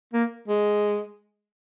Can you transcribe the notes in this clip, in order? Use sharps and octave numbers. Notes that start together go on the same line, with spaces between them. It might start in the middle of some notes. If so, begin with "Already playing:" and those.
A#3
G#3